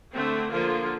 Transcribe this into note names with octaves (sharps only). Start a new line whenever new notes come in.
D3 A3 C4
D3 F3 A#3 F4